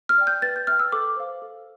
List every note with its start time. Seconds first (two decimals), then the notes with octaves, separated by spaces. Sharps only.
0.09 F6
0.18 D5 G5
0.27 G6
0.42 B4 A6
0.56 G6
0.67 E5 G5 F6
0.79 E6
0.92 A4 D6
1.16 C5 F5
1.42 A4